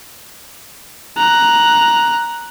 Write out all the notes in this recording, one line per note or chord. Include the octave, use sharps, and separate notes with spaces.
A#5 F#6